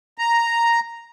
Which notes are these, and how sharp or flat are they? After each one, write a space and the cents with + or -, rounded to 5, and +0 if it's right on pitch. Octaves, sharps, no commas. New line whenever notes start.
A#5 +0